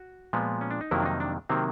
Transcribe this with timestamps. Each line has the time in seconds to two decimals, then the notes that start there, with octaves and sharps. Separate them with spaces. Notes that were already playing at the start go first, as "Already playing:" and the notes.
Already playing: F#4
0.33 A#2 F3 G#3 B3
0.61 C#4
0.71 D4
0.81 D#4
0.91 F2 C3 D#3 F#3 A#3 E4
1.01 D4
1.06 D#4
1.20 D4
1.49 C3 D#3 F#3 A#3 C4